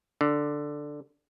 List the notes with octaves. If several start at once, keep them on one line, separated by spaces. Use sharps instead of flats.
D3